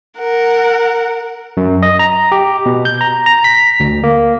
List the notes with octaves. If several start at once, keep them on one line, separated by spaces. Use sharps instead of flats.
A#4 F#5
F#2
D#5
A#5
G4
B2
G6
A#5
A#5
B6
D2
A#3